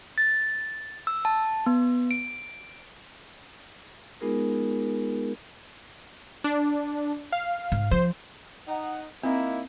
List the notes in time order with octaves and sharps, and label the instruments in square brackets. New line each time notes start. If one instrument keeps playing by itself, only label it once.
[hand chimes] A6
E6
A5
B3
D7
[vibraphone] G#3 B3 D#4 F4 G#4 A#4
[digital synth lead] D4
F5
[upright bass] G#2
[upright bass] F3 [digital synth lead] C5
[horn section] D#4 F#5
[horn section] A#3 D#4 E4 [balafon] C4